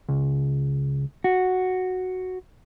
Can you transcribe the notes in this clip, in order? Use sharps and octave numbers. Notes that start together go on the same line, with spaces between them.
C#2
F#4